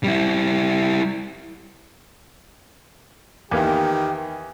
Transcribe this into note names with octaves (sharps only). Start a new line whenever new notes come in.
G3 E4
E2 D#3 A#3 B3 G4